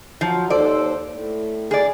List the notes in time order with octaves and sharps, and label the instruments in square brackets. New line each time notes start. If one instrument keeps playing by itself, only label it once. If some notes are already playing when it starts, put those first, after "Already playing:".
[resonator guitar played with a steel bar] F3 [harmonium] F#3
[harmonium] D#2 A4 C5 [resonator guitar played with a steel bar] D5
[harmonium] A2
[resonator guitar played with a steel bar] G#4 D5